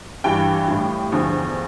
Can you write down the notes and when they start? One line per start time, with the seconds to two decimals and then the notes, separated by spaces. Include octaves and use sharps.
0.24 G2 E3 G3 G5
0.68 A2 G3
1.12 E2 D3 F3